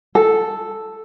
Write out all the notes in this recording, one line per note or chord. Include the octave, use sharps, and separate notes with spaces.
A4